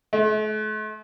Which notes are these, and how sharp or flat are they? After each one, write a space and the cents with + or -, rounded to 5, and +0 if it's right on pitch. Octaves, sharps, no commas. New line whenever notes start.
A3 -45